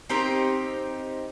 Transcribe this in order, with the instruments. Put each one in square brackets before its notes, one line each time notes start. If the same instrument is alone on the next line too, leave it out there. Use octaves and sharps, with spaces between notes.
[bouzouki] C4 D#4 G4 A#4